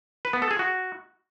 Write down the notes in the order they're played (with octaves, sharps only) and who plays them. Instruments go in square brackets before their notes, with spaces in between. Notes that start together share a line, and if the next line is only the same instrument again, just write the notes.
[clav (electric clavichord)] B4
B3
A4
G#4
F#4